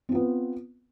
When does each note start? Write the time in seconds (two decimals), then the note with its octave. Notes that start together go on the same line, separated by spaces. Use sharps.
0.09 C4
0.12 F4
0.15 B3